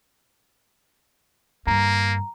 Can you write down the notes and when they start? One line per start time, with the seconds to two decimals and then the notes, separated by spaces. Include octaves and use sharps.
1.67 G2 D3 A#3 A#5